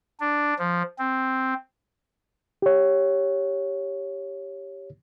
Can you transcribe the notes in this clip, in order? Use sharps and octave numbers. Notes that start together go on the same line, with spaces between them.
D4
F3
C4
G4 C#5